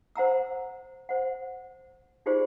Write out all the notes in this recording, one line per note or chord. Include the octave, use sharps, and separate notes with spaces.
C5 F#5 A#5 E6
C5 F#5
D#4 F4 G4 G#4 C5 D5